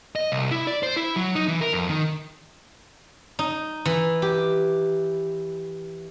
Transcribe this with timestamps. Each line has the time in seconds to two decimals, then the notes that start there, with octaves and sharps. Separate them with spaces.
0.16 D#5
0.32 C2
0.51 E4
0.67 D5
0.83 C5
0.96 E4
1.16 F#3
1.35 D#4
1.48 E3
1.61 A#4
1.74 F2
1.89 D#3
3.39 D#4
3.85 E3
4.22 G4